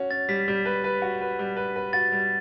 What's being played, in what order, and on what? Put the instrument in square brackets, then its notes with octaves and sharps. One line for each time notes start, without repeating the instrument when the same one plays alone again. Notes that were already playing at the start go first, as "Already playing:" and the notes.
Already playing: [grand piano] C#4 F#4
[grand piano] C#4 [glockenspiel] A6
[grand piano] G3 [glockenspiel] B6
[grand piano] G3
B4
B4
F#4
B4
G3
B4
B4
[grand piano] F#4 [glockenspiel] A6
[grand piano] G3